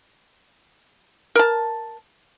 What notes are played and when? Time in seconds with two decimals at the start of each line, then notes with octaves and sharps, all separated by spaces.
1.35 A#4 A5